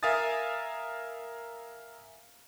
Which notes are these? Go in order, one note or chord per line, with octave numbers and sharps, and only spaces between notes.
A#4 E5 F5 G#5 D#6 A6